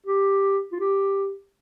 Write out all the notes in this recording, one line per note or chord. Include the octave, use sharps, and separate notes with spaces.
G4
F4
G4